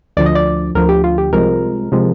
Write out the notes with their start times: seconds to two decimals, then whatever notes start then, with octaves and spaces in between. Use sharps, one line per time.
0.17 D2 D3 F3 D5
0.26 D#5
0.35 D5
0.75 D2 D3 F3 A#4
0.89 G4
1.04 F4
1.18 G4
1.33 C2 C3 F3 G#3 A#4
1.92 C3 F3 G#3